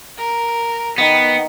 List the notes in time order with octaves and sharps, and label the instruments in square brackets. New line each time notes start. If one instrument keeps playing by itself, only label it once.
[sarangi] A#4
[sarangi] D#3 [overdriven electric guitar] B3